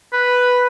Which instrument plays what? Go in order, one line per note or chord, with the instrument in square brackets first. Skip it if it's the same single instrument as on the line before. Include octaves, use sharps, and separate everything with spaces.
[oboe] B4